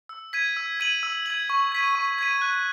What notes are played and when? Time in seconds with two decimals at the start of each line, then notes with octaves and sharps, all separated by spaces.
0.09 E6
0.33 G#6 B6 D#7
0.57 E6
0.80 G#6 D#7 F#7
1.03 E6
1.26 G#6 D#7 F#7
1.50 C#6
1.72 G#6 B6 D#7
1.95 C#6
2.19 G#6 B6 D#7
2.42 F#6